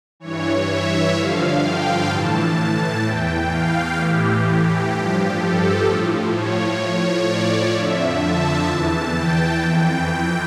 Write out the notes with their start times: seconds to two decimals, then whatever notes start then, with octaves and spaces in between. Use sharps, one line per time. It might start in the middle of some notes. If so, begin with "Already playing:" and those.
0.20 G2 E3 C#5
0.68 E5
1.14 G2 D3 F3 F5
1.62 G5
2.08 A2 E3 A5
3.03 E2 E3 G5
3.50 F5
3.96 A2 E3 G4
4.91 G2 F3
5.38 A4
5.85 A2 F3
6.31 C#5
6.79 A2 F3
7.26 D5
7.73 F2 D3 F3 E5
8.20 A5
8.67 E2 E3
9.14 G5
9.61 F2 E3